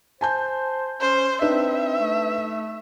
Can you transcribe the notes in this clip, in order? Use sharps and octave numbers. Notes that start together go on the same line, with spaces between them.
C5 G#5 A5 G6
C#4 C5
C4 D4 D#4 B4 E5
A3